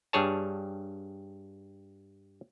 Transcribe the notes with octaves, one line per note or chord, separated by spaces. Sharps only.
G2 G3 G#4 C#5 A5